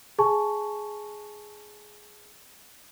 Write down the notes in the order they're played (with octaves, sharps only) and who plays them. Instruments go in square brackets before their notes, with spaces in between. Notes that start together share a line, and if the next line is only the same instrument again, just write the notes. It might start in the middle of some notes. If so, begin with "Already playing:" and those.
[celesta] G#4 G#5 A5 C#6